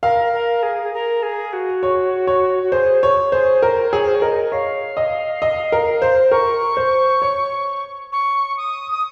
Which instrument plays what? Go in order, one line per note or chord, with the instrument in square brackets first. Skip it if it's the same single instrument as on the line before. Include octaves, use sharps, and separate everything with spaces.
[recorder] A#4 [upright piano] F5
[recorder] A#4
G#4
G#4
A#4
G#4
F#4
[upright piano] C#5
C#5
[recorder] F#4
[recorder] G#4 [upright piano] C5
[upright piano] C#5
[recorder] G#4 [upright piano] C5
[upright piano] A#4 [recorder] C5
[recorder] C5
[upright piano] G#4 [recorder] C#5
[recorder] C5
C#5
[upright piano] A#4 [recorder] D#5
[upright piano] C#5 [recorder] F5
[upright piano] D#5
D#5
A#4
C5
[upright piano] A#4 [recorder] C#6
[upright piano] C5
C#5
[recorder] C#6
D#6
D#6